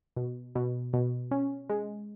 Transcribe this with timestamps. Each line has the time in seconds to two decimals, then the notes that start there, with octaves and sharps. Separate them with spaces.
0.16 B2
0.55 B2
0.93 B2
1.31 C#4
1.69 G#3